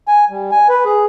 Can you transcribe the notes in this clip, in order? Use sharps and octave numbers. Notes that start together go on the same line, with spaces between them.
G#5
G3
G#5
B4
G#4